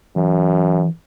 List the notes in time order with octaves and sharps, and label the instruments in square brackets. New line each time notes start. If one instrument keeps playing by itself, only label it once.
[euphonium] F#2 [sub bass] E3